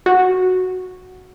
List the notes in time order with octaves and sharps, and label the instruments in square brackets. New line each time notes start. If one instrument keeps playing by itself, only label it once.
[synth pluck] F#4